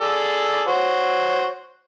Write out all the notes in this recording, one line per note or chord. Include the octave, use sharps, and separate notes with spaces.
G#4 A4 D5
F#4 C5 C#5